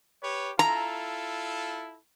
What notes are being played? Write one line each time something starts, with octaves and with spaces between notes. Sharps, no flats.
G4 B4 C#5
E4 F4 A4 A#5